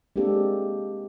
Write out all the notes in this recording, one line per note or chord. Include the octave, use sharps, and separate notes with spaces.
G#3 A#3 C4 D4 G4 A4